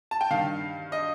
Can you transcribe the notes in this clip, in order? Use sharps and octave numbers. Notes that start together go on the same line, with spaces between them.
A5
G5
G2 D#3 F5
D#5